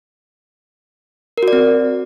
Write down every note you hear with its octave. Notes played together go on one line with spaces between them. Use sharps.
A#4
F#4
D5
C4